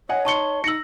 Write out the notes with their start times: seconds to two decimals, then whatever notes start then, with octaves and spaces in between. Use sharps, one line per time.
0.09 C#5 D#5 F#5 G#5
0.25 D#4 A5 C6 C#6 C#7 G7
0.64 D#4 E6 A#6 C#7 F#7